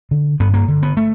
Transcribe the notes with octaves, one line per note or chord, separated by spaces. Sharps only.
D3
G2 B3
A#3
D3
B3
A3